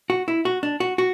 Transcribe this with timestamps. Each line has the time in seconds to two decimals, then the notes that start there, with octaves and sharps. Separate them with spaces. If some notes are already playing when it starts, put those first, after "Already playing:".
0.10 F#4
0.28 E4
0.45 F#4
0.63 D4
0.80 F#4
0.98 F#4